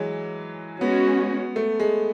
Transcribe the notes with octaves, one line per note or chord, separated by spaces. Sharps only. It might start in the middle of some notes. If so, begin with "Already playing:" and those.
Already playing: E3 F#3 G#3
G#3 B3 C#4 F#4
A3
G#3